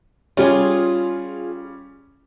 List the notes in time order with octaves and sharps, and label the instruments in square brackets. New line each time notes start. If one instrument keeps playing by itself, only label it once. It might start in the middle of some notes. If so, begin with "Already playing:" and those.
[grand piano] G3 C#4 [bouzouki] F4 F#4 G#4